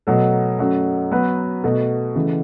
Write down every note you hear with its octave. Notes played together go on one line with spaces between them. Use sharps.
B2 F#3 A3
F#2 F#3 A3
F#3 B3 F#4 B4
B2 A3 F#4
C#3 E3 A3